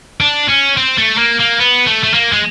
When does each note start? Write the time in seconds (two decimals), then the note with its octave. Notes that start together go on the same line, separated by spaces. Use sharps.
0.21 D4
0.49 C#4
0.77 C4
0.97 A3
1.18 A#3
1.39 A#3
1.59 B3
1.86 A3
2.04 A3
2.14 A#3
2.33 G#3